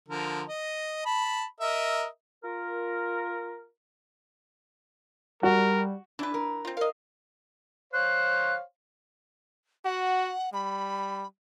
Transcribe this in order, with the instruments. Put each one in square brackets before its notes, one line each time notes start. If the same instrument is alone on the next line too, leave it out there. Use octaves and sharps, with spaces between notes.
[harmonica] D3 F3 A#4
D#5
A5 B5
A#4 D#5 E5
[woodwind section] F4 A#4
[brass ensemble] G3 [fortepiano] F#4 [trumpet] A#4
[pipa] E3 B4 [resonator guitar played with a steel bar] D4
[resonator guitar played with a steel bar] A#4
[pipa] C4 F4
[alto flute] A#4 [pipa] D#5 F5
[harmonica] C5 C#5 F5 [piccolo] F#6
[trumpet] F#4 [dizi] F#5
[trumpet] G3 [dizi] B5